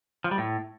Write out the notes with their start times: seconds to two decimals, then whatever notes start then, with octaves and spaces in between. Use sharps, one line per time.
0.24 F3
0.31 G3
0.38 A2